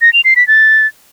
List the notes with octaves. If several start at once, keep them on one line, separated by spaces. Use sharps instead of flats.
A#6
F7
C7
B6
A6